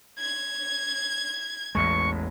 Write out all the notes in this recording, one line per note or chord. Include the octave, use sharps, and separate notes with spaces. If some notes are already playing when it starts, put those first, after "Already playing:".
G#6
A1 E2 G#3 C#6